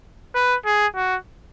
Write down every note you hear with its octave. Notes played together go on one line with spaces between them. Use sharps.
B4
G#4
F#4